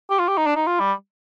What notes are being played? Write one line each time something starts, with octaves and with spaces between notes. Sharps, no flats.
G4
F4
G4
D#4
D4
D#4
F4
G3